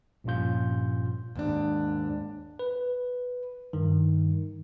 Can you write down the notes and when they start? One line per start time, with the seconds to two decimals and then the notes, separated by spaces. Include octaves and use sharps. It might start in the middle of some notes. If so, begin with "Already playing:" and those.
0.24 A#1 G2 A#2 C#4 F4 G6
1.36 D#2 G#2 D4
2.59 B4
3.73 G2 D#3